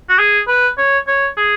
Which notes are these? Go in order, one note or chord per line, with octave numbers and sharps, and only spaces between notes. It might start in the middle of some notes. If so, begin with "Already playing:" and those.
F#4
G#4
B4
C#5
C#5
G#4